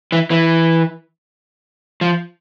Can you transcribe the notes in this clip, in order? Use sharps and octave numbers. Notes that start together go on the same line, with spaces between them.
E3
E3
F3